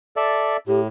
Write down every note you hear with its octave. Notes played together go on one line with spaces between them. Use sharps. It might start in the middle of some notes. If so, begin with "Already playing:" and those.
A4 D5 E5
A2 G4